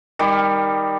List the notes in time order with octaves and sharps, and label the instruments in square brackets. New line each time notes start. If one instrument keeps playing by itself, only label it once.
[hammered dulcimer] D#3 G3 D6